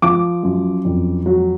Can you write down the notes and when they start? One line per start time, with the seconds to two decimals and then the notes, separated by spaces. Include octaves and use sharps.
0.02 F3 D6
0.43 F#2
0.85 F2
1.26 F#3